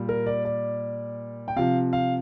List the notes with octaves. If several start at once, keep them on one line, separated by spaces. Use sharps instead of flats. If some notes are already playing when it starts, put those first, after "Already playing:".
Already playing: A#2 G3
A#4
D5
D5
G5
C3 F3 F5
F5